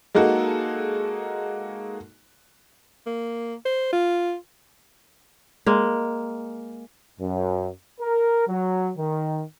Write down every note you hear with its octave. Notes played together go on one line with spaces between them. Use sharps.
G#3 A#3 D#4 F#4 A4
A#3
C5
F4
G#3 A#3
F#2
A#4
F#3
D#3